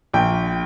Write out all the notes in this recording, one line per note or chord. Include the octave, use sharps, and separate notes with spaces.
A#1 G5